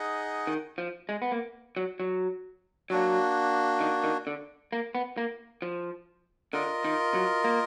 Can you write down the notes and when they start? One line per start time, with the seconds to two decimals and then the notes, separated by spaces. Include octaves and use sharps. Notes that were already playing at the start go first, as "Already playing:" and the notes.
Already playing: D#4 G#4 D#5 F#5
0.47 D#3
0.78 F3
1.09 G#3
1.22 B3
1.32 A#3
1.77 F#3
2.00 F#3
2.90 F#3 A#3 D4 F#4
3.81 D#3
4.04 D#3
4.27 D3
4.73 A#3
4.95 B3
5.18 A#3
5.62 F3
6.53 D3 F4 A#4 D#5
6.84 D#3
7.14 F#3
7.44 A#3